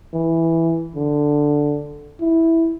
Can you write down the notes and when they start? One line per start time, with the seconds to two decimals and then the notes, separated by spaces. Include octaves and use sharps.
0.13 E3
0.95 D3
2.20 E4